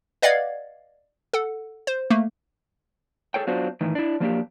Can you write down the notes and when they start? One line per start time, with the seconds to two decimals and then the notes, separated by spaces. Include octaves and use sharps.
0.22 B4 D5 D#5 F5 F#5 G#6
1.33 A4 F#5
1.87 C5
2.10 A3 A#3
3.34 G#4 A4 C#5 G5
3.47 F#3 B3 D4 F4 F#4 C5
3.81 A2 D#3 E3
3.95 D4 E4
4.20 F3 F#3 A#3 D4 F#4 G4